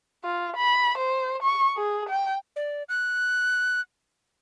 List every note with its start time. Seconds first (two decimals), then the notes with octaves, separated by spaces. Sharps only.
0.24 F4
0.56 B5
0.98 C5
1.42 C#6
1.77 G#4
2.09 G5
2.56 D5
2.89 F#6